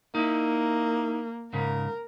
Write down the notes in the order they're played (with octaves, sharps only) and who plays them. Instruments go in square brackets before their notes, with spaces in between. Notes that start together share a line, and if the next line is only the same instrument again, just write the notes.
[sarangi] A#3 [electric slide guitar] D#4 E4
[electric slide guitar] G#2 C#3 [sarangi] A#4